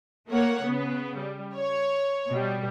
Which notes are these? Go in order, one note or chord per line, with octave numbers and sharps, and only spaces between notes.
A3 A#3 C#5 F#5
C#3 B3
G3
C#5
B2 G3